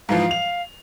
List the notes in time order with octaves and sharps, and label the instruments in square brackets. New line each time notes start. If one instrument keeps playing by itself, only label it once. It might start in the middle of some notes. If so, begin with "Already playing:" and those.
[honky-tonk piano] G#2 E3 F3 [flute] F5
[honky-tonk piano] F7